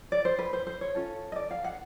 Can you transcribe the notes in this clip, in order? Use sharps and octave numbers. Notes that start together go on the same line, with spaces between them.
D5
C5
B4
C5
C5
C#5
C#4 F4 A4
D#5
D5
F5
F#5